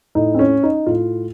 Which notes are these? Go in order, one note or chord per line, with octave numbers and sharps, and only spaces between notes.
A2 D#4
C4
C#4
D#4
A2 F4